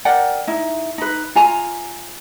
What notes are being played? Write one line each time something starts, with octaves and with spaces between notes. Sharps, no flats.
A#4 D5 F#5 G5
D#4 E4
D#4 B4
F4 G#5 A#5